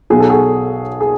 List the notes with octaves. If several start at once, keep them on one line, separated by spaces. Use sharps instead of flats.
B1 B2 F#3 G#4
A4
F#4 G#4
G#4